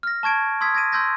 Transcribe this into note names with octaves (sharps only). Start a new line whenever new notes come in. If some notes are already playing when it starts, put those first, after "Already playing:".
F6 A#6
A5 C#6 G#6 D7
C6 D#6 E6 G#6 B6
G#6 A#6 D7 D#7
C6 E6 G6 G#6 A#6